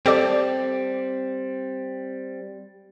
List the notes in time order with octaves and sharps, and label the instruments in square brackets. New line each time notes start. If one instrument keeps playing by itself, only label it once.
[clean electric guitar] G3 C4 [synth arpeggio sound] G4 A4 D5